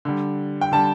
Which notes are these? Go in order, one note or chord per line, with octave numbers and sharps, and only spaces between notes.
D3 G3
G5
D3 G3 A5